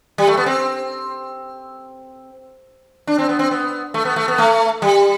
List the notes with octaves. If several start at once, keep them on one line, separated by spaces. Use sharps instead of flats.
G3
A3
B3
C4
D4
C4
B3
C4
B3
A3
B3
A3
B3
A3
G3